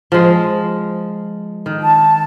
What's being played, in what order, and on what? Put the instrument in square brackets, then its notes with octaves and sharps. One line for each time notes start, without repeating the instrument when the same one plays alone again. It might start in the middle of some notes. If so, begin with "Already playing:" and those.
[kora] F3 G#3
D#3
[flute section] A5